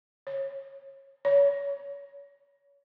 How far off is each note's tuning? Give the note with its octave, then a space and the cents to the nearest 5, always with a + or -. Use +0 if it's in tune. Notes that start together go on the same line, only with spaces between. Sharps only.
C#5 -25
C#5 +30